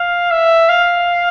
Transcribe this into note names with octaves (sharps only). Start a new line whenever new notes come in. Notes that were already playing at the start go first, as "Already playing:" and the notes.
Already playing: F5
E5
F5